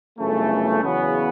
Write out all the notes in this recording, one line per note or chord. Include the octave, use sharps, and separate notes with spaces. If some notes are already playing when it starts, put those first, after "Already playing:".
G1 F#2 C#3 E3 A3
E2 C#3 F#3 B3